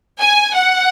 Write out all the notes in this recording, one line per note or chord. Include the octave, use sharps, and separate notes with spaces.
G#5
F#5